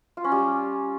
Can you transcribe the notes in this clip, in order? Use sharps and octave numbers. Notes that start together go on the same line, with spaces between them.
F4
C#4
G3